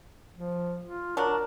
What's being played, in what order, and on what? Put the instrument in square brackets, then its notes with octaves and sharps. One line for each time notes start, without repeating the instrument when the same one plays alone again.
[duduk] F3
F4
[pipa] F#3 D4 [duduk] A#4